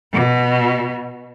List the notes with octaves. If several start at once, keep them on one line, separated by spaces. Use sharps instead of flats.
B2